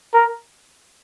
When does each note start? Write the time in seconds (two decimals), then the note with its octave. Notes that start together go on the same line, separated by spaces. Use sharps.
0.14 A#4